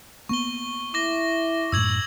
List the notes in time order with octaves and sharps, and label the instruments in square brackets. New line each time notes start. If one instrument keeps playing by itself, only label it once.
[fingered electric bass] A#3 B3 [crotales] C#6 G7
[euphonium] E4 [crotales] D6 A#6 G7
[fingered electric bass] F#2 A2 [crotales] E6 G#6 F#7